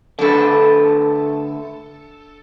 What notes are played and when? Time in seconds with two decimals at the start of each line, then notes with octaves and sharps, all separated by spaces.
0.19 D3 A3 D4 A4 B4